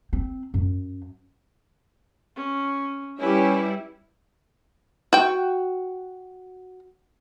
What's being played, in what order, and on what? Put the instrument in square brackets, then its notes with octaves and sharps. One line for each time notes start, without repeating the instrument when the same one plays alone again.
[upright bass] C4
F#2
[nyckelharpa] C#4
[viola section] G3 E4 [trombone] C#4 [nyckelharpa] G4 B4
[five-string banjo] F#4 G5